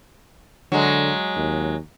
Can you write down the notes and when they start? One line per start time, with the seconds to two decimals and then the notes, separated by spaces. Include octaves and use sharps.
0.72 D3 F#3 G#3
1.36 D#2